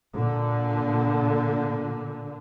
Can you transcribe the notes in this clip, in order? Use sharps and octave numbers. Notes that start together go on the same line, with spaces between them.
A#2 D3